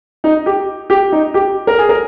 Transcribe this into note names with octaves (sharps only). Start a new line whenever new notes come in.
D#4
G4
G4
D#4
G4
A#4
G#4
A#4